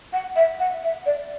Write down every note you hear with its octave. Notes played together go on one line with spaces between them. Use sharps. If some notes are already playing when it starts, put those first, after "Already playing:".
F#5
E5
F#5
E5
D5